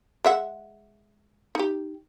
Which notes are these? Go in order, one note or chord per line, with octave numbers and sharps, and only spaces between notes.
G#3 E5 F#5
D#4 G4